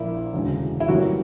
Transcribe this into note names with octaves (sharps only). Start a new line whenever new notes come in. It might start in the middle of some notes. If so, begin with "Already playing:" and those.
Already playing: A#1 A#2 A#3 E4
E1 D2 C#3
E4
G1 F#2 E3 G3 A#3 F#4